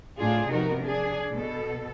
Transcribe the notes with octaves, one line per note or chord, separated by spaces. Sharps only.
A2 D4 F4 G#4
C3 F3 B3 D#4 F#4 A#4
D4 G#4
B2 A4